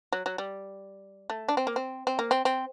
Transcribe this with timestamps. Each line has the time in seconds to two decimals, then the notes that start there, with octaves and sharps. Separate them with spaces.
0.12 F#3
0.26 F#3
0.38 G3
1.30 A3
1.48 D4
1.57 C4
1.67 A#3
1.76 C4
2.07 C4
2.19 A#3
2.31 C4
2.45 C4